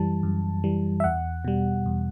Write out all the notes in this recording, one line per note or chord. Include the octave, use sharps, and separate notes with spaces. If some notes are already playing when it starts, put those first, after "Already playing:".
Already playing: F#2 E3 G3 A5
F#2
E3 G3
E5
E2 F#5
B2 G3
E2